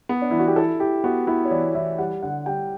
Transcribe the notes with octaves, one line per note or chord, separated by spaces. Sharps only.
B3
D4
E3 E4
F#4
G4
E4 A4
E4 G4
B3 F#4
B3 E4
C#5
E3 D5
E3 E5
G3 F#5
D3 F#5
G3 G5